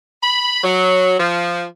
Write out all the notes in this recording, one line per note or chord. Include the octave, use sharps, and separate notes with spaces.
B5
F#3
F3